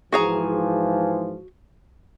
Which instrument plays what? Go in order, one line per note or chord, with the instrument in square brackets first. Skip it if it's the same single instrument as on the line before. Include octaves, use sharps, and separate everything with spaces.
[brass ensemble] G#2 E3 F3 [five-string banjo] F#4 G#4 A#5